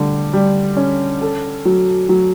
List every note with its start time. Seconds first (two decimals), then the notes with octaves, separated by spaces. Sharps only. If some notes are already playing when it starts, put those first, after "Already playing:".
Already playing: D3 G3
0.33 G3
0.77 C#4
1.21 A4
1.65 F#3
2.09 F#3